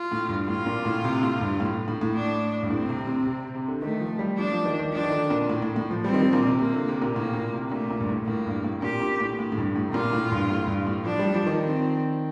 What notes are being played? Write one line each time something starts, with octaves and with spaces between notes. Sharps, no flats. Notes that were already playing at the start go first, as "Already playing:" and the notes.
Already playing: F4
A2
G2
A2 F4
A#2
A2
C3
A2
G2
A2
A2
A2
D4
G2
A2 C4
C3
C3
C3
C3
D3
D#3 A3
F3
G3
F3 D4
F3
D#3
D#3
F3 D4
D#3
D3
A#2
A2
A2
A2
F3
G3 C4
D#3
F3
A#2
C3
C3 A#3
D3
C3
A#2
A2 A#3
A#2
C3
A#2 A3
A#2
G2
A2
A2 A#3
G2
A2
A#2 G4
A#2
A2
A2
A2
G2
A2
C3
A#2 F4
A2
G2
A2
G2
A2
F3 D4
G3
F3
D#3
C4